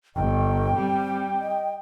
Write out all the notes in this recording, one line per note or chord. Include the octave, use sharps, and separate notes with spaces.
G1 D#5 G5
G3 C4
D#5